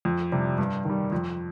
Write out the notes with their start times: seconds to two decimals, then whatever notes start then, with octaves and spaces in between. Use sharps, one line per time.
0.05 F2
0.32 C3 G3
0.58 G2
0.85 D#3 G3
1.12 F2